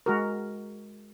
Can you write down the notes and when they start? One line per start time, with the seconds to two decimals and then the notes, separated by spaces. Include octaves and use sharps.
0.06 G#3 F#4 A#4